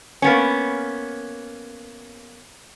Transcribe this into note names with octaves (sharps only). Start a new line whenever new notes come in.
A#3 B3 C#4